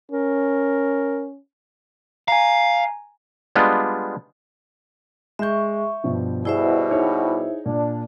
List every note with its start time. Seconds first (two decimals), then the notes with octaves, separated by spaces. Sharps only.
0.11 C#4 A#4
2.28 F5 G#5 A#5
3.56 G3 G#3 B3 D4 F4
5.39 G#3 E5 C#6 G6
6.04 G2 B2 F3
6.45 B2 G3 E4 G#4 C5 E5
6.91 D#4 G#4 C#5
7.66 A#2 D4